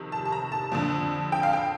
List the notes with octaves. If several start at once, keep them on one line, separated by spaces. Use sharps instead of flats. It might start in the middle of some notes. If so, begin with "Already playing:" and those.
Already playing: F2 C3 D#3
A5
A5
A#5
A5
F2 D3
G5
F5
G5